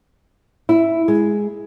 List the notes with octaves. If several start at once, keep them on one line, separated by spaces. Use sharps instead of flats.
E4
G#3